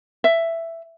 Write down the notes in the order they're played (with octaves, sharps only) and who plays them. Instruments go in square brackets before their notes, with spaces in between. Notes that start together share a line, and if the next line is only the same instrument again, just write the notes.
[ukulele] E5